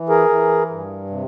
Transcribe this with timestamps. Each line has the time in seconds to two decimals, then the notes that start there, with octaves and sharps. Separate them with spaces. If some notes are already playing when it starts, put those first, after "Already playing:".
Already playing: E3
0.09 G#4 A#4
0.29 E3
0.70 G2
1.10 C3